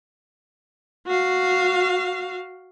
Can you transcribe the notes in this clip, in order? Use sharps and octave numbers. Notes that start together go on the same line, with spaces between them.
F#4 F5